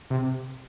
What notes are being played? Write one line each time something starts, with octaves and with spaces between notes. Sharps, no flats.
C3